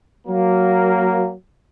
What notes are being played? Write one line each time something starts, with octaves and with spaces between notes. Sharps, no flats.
F#3 A#3